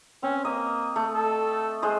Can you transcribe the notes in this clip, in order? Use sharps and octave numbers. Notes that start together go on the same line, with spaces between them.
C4 C#4
A#3 D#5
A3
A4
G#3 C5 D#5